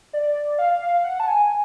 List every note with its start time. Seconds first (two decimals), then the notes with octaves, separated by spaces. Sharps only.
0.13 D5
0.59 F5
0.82 F5
1.04 F#5
1.20 A5
1.28 G#5